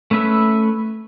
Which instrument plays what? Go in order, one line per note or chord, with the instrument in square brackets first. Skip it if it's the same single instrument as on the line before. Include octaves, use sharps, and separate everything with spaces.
[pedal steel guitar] A3 C#4 B4 E5 E6